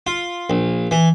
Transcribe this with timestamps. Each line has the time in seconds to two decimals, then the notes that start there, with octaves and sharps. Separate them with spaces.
0.07 F4
0.50 A#1
0.91 E3